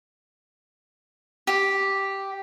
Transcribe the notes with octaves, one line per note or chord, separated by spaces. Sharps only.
G4